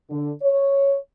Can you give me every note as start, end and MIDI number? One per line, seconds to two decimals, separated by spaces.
0.10 0.31 50
0.43 0.96 73